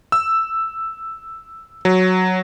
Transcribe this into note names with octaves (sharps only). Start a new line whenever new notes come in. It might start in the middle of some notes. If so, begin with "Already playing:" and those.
E6
F#3